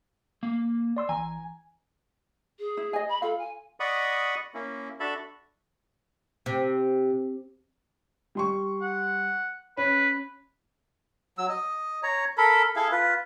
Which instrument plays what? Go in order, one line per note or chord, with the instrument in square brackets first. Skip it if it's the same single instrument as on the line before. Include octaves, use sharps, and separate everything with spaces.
[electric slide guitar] A#3
[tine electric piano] D5 C6 E6
[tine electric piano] A#1 E3 A#5 [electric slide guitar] G#5
[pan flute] G#4
[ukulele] E4
D#5 G#5
[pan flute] B5
[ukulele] F4 F5 [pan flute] A4
[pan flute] G#5
[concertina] D5 D#5 F#5 B5 C#6 D#6
A#3 C#4 E4
D4 F#4 A4 E5 A5 B5
[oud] C3
[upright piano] G3 C6 C#6
[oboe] F#5
[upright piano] C#4 [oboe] B4
[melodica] F#3 E6
D#5
C#5 A#5
A4 A#4 B5
E4 G#4 A4 F5
F4 B4